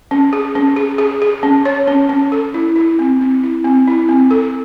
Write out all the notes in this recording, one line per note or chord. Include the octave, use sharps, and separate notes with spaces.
C#4
G#4
C#4
G#4
G#4
G#4
C#4
C#5
C#4
C#4
A4
E4
E4
C4
C4
E4
C4
E4
C4
A4